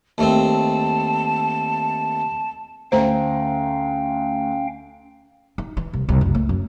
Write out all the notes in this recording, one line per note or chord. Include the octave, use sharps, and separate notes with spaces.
D#2 A3 C4 A5
D2 C#4 C5 F5 G5 A#5
D#4
E3
C2
C2
F#1
A3
F#2